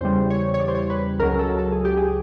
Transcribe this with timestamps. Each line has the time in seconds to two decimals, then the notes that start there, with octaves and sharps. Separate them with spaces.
0.01 E2 C#3 E3 G3 C5
0.30 C#5
0.54 C#5
0.60 D5
0.68 C5
0.75 C#5
0.90 B4
1.19 C#2 C#3 F#3 A#4
1.39 A4
1.59 A4
1.72 G#4
1.85 G4
1.97 G#4